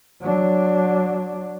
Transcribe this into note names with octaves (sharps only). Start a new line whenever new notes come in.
F#3 D4